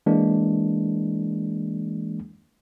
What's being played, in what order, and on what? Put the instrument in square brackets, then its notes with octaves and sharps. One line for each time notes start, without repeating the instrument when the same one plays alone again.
[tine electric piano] E3 G#3 A#3 D4